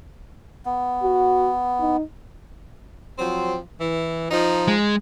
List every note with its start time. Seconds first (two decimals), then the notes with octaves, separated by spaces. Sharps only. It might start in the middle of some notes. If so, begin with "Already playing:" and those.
0.66 B3
1.03 F#4
1.81 D#4
3.19 F3 F#3 C4
3.80 E3
4.31 F3 D#4
4.68 G#3